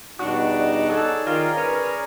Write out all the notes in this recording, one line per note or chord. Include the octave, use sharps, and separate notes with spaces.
E2 B2 G3 D4 D#4 F#4
G#4 A4 C#5 D5
D#3 F4 A#4
C#4 B4